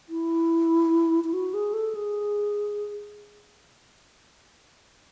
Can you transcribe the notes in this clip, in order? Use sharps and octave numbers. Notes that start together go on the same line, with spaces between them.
E4
E4
F#4
G#4
A4
G#4